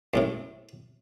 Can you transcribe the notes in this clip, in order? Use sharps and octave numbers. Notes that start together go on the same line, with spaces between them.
F#2 A2 C3